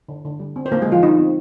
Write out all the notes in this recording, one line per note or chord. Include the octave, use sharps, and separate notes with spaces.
D3
D3
G3
C4
C5
D3 A#3 A#4
G#3 G#4
D3 F3 F4
G3 D#4
C4